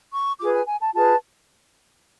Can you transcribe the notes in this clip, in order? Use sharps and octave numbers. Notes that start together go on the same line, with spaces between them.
C#6
F4 G#4 B4 D6
G#5
G#5
A5
F4 G#4 B4 A5